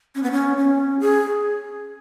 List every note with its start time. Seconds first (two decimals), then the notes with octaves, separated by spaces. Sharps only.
0.15 C#4
0.23 B3
0.32 C#4
0.57 C#4
1.00 G#4